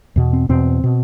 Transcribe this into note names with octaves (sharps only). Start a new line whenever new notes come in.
E2 B2
C4
E2 B2 C4
B2